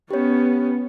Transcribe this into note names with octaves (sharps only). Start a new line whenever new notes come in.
B3 C#4 G4 C#5